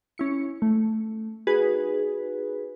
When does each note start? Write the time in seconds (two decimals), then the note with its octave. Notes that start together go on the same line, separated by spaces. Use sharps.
0.18 C#4 E4 C#7
0.62 A3
1.47 D#4 F#4 G#4 B4